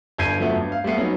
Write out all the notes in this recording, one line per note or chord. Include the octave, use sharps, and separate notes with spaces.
G1 G2 G6 G#6 C7 D#7
F3 F#3 A3 B3
G2
F5
G3 A3 B3 C7
F#3 B3 C#4 D#4